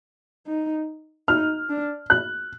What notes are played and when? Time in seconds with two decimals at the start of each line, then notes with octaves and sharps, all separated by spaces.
0.46 D#4
1.28 D#4 F6
1.69 D4
2.10 F#6